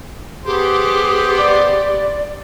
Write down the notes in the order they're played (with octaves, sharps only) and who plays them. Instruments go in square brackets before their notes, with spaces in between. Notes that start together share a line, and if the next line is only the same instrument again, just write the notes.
[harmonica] B3 C5 [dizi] G4 [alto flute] G#4
[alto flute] D5